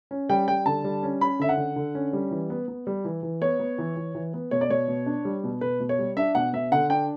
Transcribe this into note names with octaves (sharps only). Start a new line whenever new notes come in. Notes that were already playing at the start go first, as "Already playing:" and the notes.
C#4
G3 G5
G3 G5
D3 A5
G3
C#4
C#4 B5
D3 E5
F#5
D3
D3
C#4
G3
E3
B3
B3
G3
E3
E3
B3 C#5
B3
E3
E3
E3
B3
B2 C#5
D5
B2 C#5
B2
D4
G3
B2
B2 B4
B2
C#5
G3
D4 E5
B2 F#5
B2 E5
D3 F#5
D4 G5